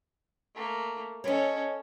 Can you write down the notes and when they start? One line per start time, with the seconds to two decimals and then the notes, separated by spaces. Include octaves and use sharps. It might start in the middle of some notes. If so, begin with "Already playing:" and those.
0.55 A3 A#3
1.24 C#4 A4 C#5 D#5